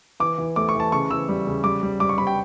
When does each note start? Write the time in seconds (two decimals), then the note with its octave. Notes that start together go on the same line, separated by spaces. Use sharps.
0.20 E3 D6
0.38 E3
0.56 A3 D6
0.69 C#6
0.75 E3
0.80 A5
0.92 C#3 C#6
1.11 E3 E6
1.29 G3
1.47 C#3
1.64 G3 D6
1.82 G3
2.00 G3 D6
2.09 C#6
2.18 G3 B5
2.27 G5